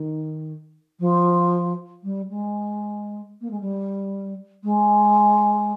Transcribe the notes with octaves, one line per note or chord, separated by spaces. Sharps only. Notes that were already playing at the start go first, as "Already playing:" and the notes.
Already playing: D#3
F3
G3
G#3
A#3
G#3
G3
G#3